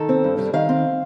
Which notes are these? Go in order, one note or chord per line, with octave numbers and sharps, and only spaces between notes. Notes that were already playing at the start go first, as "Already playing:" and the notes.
Already playing: D#3 A4
C4
G2
G3
D#3 F5
C4